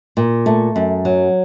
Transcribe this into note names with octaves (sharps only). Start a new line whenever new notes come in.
A#2
A3
F#2
F#3